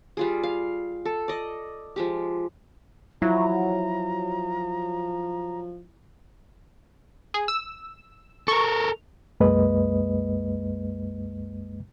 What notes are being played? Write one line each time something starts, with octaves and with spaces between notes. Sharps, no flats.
G3 F4 G#4
F5
A4
D5 D#5
F3 G#3 G4
F3 F#3 E4 A#5
G#4
E6
A4 A#4 C#6
C2 F#2 G#3 A#3 B4 D#5